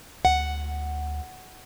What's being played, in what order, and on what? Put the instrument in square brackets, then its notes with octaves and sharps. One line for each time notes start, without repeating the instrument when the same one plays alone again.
[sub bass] D2 [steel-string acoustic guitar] F#5